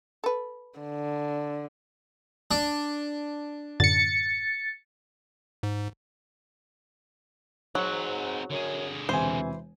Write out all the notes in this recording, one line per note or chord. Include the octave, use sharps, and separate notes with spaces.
A4 B4
D3
D4
F#2 A2 D3 A6 C#7
G#2
G#2 F#3 C4 F#5
F#2 D3 G#4
E1 C3 E3 C5 G#5